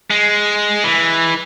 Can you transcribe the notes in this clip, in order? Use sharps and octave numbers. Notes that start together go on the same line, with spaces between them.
G#3
E3